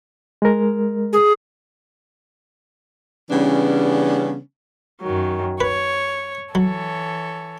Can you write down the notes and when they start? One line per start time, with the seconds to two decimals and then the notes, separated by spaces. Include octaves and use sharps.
0.42 G#3 A#4
1.13 G#4
3.31 C#3 E3 G3 B3 C#4 D4
5.02 F#2 D#3 F#3
5.61 B4 C#5
6.55 E3 F#3 A4 C#5